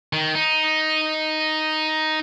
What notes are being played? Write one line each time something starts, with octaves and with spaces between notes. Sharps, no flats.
D#3
D#4